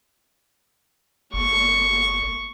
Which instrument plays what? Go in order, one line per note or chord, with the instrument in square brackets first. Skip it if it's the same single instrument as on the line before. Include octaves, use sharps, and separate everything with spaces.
[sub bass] F#1 [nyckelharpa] C#6